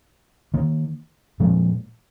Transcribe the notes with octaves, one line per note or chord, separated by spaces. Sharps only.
D#3 A#3
A#2 F3 G#3